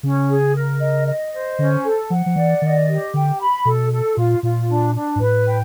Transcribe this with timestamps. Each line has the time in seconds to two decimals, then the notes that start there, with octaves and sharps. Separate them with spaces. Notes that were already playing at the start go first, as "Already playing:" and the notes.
0.03 C#3 C#4
0.29 G#4
0.55 A#4
0.81 D#5
1.07 D#5
1.33 C5
1.58 D3 C#4
1.84 A4
2.10 F3 F#5
2.26 F3
2.36 E3 D5
2.61 D#3 D#5
2.88 G4
3.14 D3 G5
3.39 B5
3.65 B2 A4
3.91 A4
4.17 A#2 F4
4.42 A#2 F4
4.69 D4
4.95 D4
5.16 G#2
5.20 A2 B4
5.47 G5